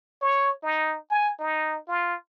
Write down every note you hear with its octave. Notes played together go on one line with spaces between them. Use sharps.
C#5
D#4
G#5
D#4
F4